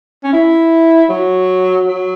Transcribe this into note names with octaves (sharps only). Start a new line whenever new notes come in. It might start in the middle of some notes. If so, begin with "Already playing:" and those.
C#4
E4
F#3
F#3